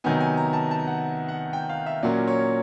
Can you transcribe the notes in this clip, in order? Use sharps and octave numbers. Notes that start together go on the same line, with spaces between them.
C3 D#3 F#3 B3 D#4 G#5
G#5
A#5
A5
A5
F#5
F#5
G5
F5
E5
A#2 F#3 A#3 C#4 D5
C#5